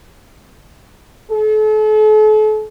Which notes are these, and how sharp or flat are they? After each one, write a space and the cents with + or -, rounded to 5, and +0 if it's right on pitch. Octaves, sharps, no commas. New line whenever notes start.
A4 -40